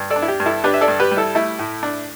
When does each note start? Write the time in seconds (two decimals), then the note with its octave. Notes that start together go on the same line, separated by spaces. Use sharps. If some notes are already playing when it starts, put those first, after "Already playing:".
Already playing: G2
0.10 A4 D5
0.16 D4
0.22 E4
0.28 G4
0.40 G2
0.46 E4 A4
0.64 D4 G4 B4
0.74 E5
0.81 A4 D5
0.88 G2
1.00 G4 B4
1.11 G3
1.17 E4 A4
1.35 A3 E4
1.59 A2
1.83 D4